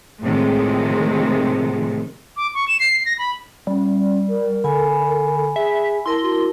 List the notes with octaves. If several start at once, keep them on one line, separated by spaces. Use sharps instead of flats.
A2 C3 D#3 F3 G#3
D6
C#6
E7
C7
A#6
B5
G3 C#4
A#4
D3 G#5 B5
G#4 E5
E4 A#4 A5 C6
F#4